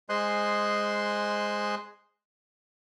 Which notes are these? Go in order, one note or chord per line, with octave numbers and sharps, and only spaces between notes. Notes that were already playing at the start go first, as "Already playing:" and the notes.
G#3 C5 D#5 G#5 C6 F#6